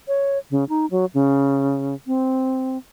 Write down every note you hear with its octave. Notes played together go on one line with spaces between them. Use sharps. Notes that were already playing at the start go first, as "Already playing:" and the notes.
C#5
C#3
D#4
F#3
C#3
C4